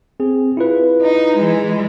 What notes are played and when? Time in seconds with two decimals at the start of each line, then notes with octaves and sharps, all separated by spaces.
0.20 C4 G#4
0.57 E4 F4 B4
1.02 D#4
1.37 E3 G#3